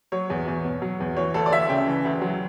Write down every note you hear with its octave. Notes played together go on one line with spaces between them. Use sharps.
F#3 C#5
E2
E2
B2
F#3
E2
E3 C#5
D2 A4
D5
D2 E5
C#3 G5
E3
D2
F#3